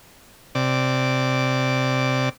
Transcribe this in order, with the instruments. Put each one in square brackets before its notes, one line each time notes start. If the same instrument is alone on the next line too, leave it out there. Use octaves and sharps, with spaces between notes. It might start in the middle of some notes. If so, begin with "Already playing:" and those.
[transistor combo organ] C3 D5